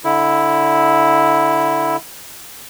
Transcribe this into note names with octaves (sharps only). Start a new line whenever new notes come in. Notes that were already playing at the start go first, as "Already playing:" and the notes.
D3 E4